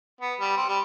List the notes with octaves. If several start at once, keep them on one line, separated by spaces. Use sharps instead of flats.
B3
G3
C4
G3